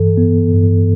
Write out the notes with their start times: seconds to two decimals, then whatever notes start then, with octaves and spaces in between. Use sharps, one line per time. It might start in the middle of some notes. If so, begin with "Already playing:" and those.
Already playing: G2 E3 A4
0.17 B3
0.54 G2